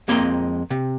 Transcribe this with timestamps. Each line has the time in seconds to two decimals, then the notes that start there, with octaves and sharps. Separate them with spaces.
0.08 F2 G#3 A#3 C4 D#5 A#5
0.70 C3